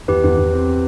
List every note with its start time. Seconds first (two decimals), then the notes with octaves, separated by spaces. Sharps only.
0.08 E2 G4 B4
0.24 E2
0.37 E2
0.53 C4